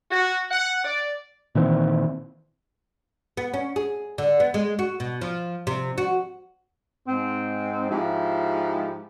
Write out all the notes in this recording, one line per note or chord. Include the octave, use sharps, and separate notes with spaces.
F#4
F#5
D5
A#2 D#3 E3 C4
B3
C#4
G#4
D3
B3
G#3
F#4
B2
F3
C3
F#4
G#2 C4
G#2 F3 E4 G4